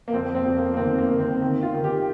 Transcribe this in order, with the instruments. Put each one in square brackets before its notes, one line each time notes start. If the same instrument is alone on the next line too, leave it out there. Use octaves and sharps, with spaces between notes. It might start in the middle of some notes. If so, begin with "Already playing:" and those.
[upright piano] A#3
F2 C4
C4
F2
A#3
A#3
D#3 C4
A#3
D#3
C4
D#3
F4
D#3
G4